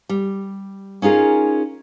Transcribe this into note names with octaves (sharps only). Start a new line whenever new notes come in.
G3
C#4 D#4 F4 G#4 A#4